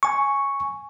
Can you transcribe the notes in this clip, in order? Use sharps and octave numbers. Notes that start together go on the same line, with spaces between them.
G#5 C#6